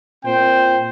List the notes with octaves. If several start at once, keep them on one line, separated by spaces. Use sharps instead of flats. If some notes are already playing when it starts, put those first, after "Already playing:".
A#2 C4 C5 G5